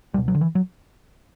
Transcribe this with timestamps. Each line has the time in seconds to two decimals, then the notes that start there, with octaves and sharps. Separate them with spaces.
0.14 C#2 G3
0.17 B2
0.28 F#3
0.34 D3
0.41 E3
0.55 F#3